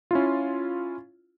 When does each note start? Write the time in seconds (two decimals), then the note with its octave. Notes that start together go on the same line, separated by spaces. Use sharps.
0.11 C#4 E4 F4